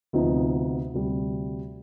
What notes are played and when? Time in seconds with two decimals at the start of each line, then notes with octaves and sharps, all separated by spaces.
0.13 D2 C3 F3 B3 D#4
0.93 D2 C3 G3